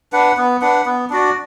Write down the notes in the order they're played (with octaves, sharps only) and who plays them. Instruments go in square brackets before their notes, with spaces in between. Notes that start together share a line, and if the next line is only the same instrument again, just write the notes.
[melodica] D4 B4 F#5
B3
D4 B4 F#5
B3
D4 F#4 D5